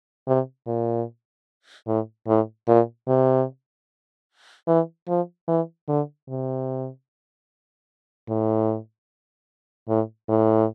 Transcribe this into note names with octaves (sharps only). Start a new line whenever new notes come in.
C3
A#2
A2
A2
A#2
C3
E3
F3
E3
D3
C3
A2
A2
A2